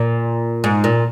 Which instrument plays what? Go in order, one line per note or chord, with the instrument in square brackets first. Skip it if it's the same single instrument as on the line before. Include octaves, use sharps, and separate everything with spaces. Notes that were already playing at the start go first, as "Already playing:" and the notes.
Already playing: [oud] A#2
G#2
A#2